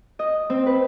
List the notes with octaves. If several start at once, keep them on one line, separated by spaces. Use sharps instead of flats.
D#5
C4
B4